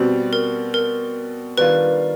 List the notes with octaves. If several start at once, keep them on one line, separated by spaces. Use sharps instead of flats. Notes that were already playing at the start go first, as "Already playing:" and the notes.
Already playing: B2 G3 C4
A#4
A#4
D#3 G3 B3 D4 F4 B4